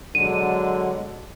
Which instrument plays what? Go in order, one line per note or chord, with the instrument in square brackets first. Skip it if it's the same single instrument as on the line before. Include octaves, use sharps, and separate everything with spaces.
[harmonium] B2 F#3 G#3 [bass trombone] D3 [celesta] D#7